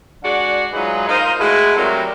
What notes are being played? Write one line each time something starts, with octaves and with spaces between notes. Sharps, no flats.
G#3 D4 F#4 D5 F#5
F#3 G#3 D#4 F4 G#4 B4
D#4 F4 A#4 C5 D#5 F5
G#3 A3 E4 F#4 A4 B4
F#3 G3 A3 C4 A#4